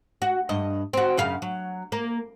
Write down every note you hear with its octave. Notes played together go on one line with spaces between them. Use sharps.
F#4
G2 D#5
C4 F#4
F#2 C#3 F5
F#3
A#3